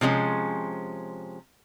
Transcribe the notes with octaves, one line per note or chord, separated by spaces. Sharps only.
C3 F3 G#3 C#4